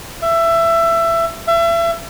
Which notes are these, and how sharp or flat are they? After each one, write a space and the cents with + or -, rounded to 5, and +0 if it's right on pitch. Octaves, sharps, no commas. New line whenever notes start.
E5 +20
E5 +35